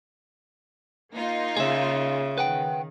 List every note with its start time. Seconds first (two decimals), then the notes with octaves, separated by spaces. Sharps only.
1.15 A#3 D#4 F4
1.57 C#3 G#4 E5
2.38 D#3 B4 F#5 G5